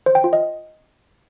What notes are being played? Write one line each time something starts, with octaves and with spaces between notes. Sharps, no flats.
C5
G5
F4
D#5